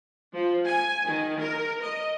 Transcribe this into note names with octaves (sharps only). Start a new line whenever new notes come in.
F3
G#5
D#3
A#4
D#5